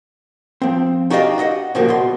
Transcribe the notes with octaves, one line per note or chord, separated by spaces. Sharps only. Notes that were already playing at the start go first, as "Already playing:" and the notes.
F3 C4
D#4 F#4 G4 D5 D#5 F5
F#4 D#5 E5 F#5
A#2 C#3 F3 G3 A#3 F#4
B2 C6